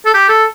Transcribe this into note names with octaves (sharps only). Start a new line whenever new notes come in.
A4
G4
A4